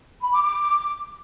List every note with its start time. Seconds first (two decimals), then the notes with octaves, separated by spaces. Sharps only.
0.21 B5
0.32 D6
0.42 D6